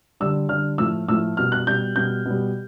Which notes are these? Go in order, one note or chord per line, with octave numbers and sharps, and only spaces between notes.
D3 G3 E6
D3 G3 F6
A2 F3 A3 E6
A2 F3 A3 E6
B2 G3 F6
F#6
B2 G3 G6
B2 G3 G6
B2 G3